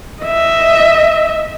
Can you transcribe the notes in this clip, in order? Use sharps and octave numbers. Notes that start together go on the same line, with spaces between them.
D#5 E5